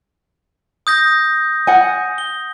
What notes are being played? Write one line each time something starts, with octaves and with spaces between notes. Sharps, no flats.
D#6 G6 A#6
F#5 G#5
G7